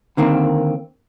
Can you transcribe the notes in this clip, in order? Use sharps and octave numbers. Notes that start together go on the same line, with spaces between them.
D3 D#3 A#3 C4